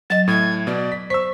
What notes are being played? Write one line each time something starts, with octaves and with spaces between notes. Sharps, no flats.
F#3 D#5 A6
A2 G#6
B2 D5
B6
C5 C#6 E6 B6